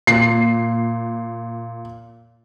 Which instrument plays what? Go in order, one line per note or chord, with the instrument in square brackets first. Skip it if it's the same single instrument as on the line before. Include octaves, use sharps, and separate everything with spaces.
[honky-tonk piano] A#2 [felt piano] C7